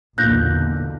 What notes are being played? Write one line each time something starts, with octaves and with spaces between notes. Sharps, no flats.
B1 E2 A#2 D3 F#6 G6 A#6